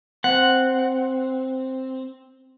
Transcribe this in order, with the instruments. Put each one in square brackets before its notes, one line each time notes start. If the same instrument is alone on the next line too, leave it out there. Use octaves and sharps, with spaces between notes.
[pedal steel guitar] C4 [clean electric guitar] F#5